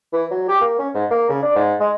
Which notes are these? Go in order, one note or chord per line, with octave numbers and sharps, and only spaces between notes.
E3
F#3
G4
A#3
C#4
G#2
A#3
C#3
D4
G#2
G#3